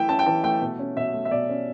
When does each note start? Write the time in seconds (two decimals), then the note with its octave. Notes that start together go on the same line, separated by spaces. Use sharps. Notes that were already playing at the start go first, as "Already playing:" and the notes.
Already playing: E3 A3 E4 E5 G5
0.09 C#4 A5
0.19 G5
0.26 E3 A5
0.44 A3 G5
0.62 B2
0.79 C#4
0.97 B2 E5
1.14 A3
1.25 E5
1.31 B2 D5
1.49 C#4